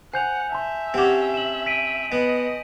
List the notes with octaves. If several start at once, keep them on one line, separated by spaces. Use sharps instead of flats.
C5 F#5 G#5 G6 F7
E5 A5 C6
C4 C#4 G4 F#5 D6
E7 F#7
B6 D7 D#7
B3 D#5